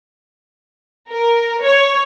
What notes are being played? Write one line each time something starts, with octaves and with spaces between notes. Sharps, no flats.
A#4
C#5